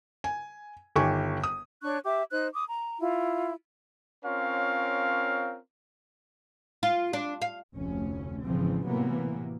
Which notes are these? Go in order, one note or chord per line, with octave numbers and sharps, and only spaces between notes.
G#5
G1 D#3 G4 G#5 C#6
D#6
D4 C#5 C#6 F#6
G4 E5 D6
D#4 C5 F#6
D6 D#6
A#5
E4 F4
C4 C#4 F4 A#4 C#5 F5
F4
D4
F5
F1 D2 C#4
G#1 F2 C#3 E3 F3 C4
A2 C3 E3 F#3 A#3 B3